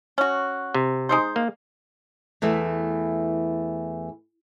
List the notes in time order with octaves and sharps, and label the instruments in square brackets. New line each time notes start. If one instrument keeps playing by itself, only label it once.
[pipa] C#4 F#4
[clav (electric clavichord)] C3
[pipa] G#3 D#4 C5
[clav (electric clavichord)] A#3
[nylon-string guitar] E2 E3 A3 E5